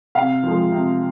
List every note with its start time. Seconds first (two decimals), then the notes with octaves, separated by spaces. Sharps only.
0.15 C3 F5
0.43 F3 G#3
0.72 C3